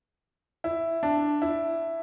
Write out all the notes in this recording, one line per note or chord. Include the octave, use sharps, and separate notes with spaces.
E4
D4
E4